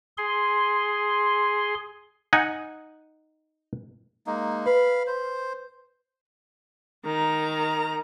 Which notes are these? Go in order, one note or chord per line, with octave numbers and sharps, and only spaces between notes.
G#4 C6
D#4 F#5 G#5
G#3 A#3 D#4
B4 F5 B5
C5
D#3 A#5